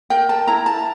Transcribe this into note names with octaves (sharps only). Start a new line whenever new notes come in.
A#4 G5
A5
E4 A#5
A5